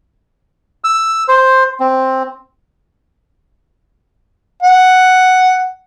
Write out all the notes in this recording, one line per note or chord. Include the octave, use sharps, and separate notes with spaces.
E6
C5
C4
F#5